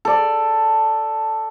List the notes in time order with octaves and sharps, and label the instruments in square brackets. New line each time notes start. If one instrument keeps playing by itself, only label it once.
[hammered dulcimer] A4 D5